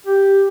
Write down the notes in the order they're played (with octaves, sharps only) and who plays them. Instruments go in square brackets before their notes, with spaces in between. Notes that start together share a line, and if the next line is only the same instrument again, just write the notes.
[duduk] G4